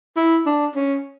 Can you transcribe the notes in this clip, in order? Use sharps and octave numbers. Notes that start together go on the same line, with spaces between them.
E4
D4
C#4